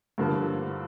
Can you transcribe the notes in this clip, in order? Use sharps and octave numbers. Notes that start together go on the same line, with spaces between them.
G2 D3 F3 A#3